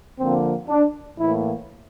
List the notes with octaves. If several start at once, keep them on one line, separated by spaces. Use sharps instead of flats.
D3 F3 A#3 C4
D4
A2 E3 A#3 E4